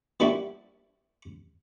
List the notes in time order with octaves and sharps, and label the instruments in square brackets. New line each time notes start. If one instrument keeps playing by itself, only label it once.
[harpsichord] F3 G3 A#3 D4 E4 F#4